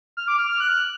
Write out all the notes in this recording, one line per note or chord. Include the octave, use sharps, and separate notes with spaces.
F6
D6
F6
F6
F#6